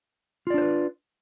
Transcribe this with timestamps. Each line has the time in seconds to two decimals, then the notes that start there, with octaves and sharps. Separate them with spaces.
0.47 F4
0.50 D5
0.54 D4
0.58 C5
0.62 B4